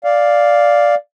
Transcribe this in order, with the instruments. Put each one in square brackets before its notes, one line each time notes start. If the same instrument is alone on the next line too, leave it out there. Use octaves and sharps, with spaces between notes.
[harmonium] D5 F5